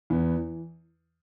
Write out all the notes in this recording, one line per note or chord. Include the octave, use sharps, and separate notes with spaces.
E2 B3
E3